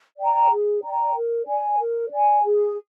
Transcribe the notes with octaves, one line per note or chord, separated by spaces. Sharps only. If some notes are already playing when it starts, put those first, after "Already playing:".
D5 G5 A#5
G#4
D5 G5 A#5
A#4
D5 G#5
A#4
D5 G#5
G#4